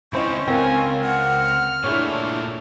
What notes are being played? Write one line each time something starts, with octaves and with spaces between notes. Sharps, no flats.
C#2 C4 C#4 E4 C5 D#5 C#6
C#2 C4 A#4 F5 G#5
F#5 F6
A#2 A3 D4 E4 G#4 C#5